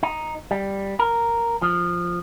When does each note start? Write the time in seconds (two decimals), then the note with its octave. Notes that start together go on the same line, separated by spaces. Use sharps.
0.03 D#4
0.51 G3
0.99 A#4
1.62 F3